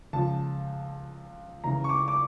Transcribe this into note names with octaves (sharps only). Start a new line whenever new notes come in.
C#2 C#3 F3 A5
C#2 C#3 E3 A#5
C#6
D6
D6